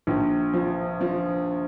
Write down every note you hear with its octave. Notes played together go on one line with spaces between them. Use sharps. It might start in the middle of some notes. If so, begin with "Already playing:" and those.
A#1
F3
F3